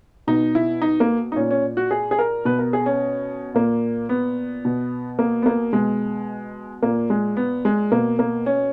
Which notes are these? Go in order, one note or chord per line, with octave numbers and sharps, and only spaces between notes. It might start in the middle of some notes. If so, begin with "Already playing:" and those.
B2 D#4
E4
D#4
A#3
D#4
A#2 C#4
C#4
F#4
G#4
G#4
A#4
B2 B4
A#4
G#4
C#4
A#2 A#3
B3
B2
A#3
B3
A#3
B2 G#3
A#2 A#3
G#3
B3
G#3
B2 A#3
A#3
C#4